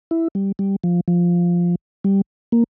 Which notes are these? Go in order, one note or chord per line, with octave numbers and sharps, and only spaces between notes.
E4
G3
G3
F3
F3
G3
A#3